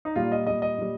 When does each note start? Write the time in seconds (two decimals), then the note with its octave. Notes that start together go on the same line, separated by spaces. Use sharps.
0.05 D#4
0.16 A#2 G3 F4
0.32 D#5
0.47 A#2 G3 D#5
0.62 D#5
0.78 A#2 G3